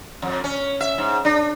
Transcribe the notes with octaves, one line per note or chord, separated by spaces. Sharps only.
F2
C#4
E5
G#2
D4